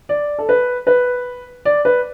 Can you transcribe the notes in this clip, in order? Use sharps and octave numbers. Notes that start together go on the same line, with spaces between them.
D5
A4
B4
B4
D5
B4